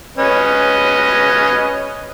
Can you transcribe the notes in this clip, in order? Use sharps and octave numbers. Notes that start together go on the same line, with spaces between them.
C#4 B4 D#5